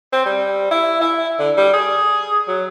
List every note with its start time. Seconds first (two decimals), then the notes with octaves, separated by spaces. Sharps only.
0.13 C4
0.26 G3
0.71 E4
1.01 E4
1.39 D3
1.57 G3
1.73 G#4
2.48 F#3